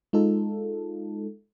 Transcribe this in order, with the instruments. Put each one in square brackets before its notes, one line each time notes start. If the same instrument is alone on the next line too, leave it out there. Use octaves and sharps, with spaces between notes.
[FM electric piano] G#3 D#4 F4 A4